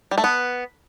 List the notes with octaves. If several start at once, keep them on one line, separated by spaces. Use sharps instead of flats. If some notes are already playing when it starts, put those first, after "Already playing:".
G3
A3
B3